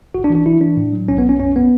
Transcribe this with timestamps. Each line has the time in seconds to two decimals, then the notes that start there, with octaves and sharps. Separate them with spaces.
0.14 G#1 F#4
0.24 D4
0.30 E3
0.35 D4
0.46 E3 E4
0.61 E3 D4
0.77 A2
0.93 F#3
1.08 B1 C#4
1.18 B3
1.24 B1 C#4
1.39 F#2 C#4
1.56 B3